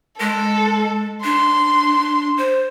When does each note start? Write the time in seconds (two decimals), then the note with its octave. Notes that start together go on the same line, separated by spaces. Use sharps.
0.20 G#3 A4
1.24 D4 C6
2.37 C5